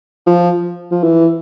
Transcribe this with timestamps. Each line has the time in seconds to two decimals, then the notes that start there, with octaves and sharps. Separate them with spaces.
0.27 F3
0.92 F3
1.04 E3